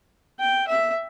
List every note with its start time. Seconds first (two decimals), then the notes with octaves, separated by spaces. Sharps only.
0.40 G5
0.68 E5